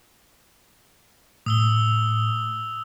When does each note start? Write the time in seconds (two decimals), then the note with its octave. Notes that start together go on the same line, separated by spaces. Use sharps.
1.46 A2 D#6 E6 G7